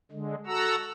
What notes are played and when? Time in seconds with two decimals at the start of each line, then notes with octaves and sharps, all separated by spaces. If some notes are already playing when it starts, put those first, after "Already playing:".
0.12 D3 G#3
0.47 F#4 A4 F#5 A#5 E6